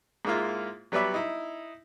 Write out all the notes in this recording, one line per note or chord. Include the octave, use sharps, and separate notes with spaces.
G#2 G#3 A#3 E4 F4
F#3 G3 B3 B4 D5 E5
D#4 E4